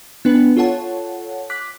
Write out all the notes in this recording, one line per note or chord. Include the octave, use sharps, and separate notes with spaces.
B3 D4 B4
F4 A4 C#5 F#5 A5
D6 F#6 B6